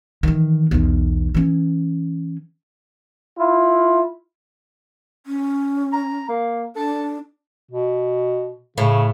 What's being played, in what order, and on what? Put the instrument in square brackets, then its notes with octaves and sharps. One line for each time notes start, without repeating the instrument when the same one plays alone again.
[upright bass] D#3 E3
B1 E2
E3 C#4
[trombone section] E4 F4
[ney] C#4
[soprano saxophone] A#5
A#3
[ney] D4 [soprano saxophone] A4
[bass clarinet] B2
[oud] A2 [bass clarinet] C#3